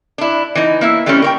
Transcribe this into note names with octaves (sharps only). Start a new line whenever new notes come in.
D4 E4
E3 D#4
A#3 E4 E5
E3 G3 A3 C4 C#4
A#4 C#5 G5